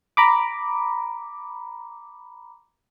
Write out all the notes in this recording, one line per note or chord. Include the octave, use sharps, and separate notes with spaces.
A#5 B5 D6